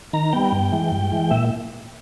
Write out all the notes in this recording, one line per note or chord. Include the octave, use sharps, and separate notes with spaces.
D#3 A#5
G3 B3 G5
G2
E3 G#3
G2
E3 G#3
A#2 E5